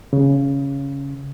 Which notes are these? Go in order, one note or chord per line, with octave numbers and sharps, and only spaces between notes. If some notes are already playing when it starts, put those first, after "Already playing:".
C#3